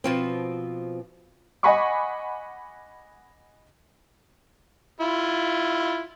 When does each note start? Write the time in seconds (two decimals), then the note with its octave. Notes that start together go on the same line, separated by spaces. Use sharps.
0.04 B2 F3 C4
1.63 D#5 F#5 G#5 B5 C#6 D6
5.01 E4 F4